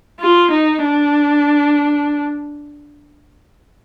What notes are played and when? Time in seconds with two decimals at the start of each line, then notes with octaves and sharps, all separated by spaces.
0.20 F4
0.51 D#4
0.84 D4